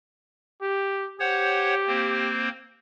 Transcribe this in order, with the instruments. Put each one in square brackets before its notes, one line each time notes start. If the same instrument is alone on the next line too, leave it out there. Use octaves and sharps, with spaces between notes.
[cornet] G4
[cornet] G4 [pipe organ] C5 C#5 F#5
[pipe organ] A#3 C4 C5